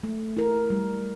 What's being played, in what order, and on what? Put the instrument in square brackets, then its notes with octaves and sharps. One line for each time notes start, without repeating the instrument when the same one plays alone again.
[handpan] A3
E4 A#4
G3